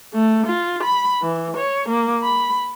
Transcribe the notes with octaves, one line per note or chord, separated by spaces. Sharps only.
A3
F4
B5
E3
C#5
A#3
B5